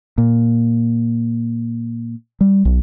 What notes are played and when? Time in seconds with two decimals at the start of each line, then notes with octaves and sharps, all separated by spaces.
0.18 A#2
2.41 G3
2.65 B1